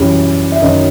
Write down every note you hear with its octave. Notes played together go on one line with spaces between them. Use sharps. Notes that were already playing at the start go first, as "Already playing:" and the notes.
Already playing: F#2 E3 G3 G4
E5
F#2 D#3 F#3 D#5